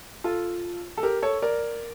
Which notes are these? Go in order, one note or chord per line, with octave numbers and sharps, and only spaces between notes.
F4 A4
A4
G4 A#4
A4 C#5
A#4 D5